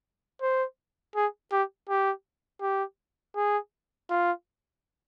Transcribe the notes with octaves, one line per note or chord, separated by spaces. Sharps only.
C5
G#4
G4
G4
G4
G#4
F4